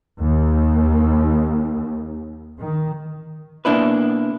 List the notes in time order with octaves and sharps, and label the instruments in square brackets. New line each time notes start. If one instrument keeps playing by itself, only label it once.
[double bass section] D#2
D#3
[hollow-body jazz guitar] B2 A#3 D4 E4 B4